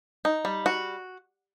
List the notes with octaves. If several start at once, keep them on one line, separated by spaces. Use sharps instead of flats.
D#4
G3
F#4